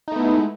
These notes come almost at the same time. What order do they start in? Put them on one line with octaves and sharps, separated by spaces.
D#4 A3 B3 E4 G#3